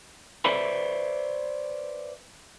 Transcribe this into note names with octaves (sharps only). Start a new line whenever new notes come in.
B4 C5 D5 E5 B5